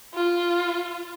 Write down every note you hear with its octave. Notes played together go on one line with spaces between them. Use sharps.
F4